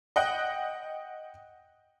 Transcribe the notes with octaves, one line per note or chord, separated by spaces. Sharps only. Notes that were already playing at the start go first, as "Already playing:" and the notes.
D#5 F#5 G5